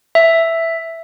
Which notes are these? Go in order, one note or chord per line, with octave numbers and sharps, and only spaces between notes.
E5